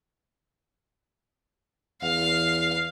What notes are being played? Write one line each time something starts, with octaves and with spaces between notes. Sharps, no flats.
E2 F5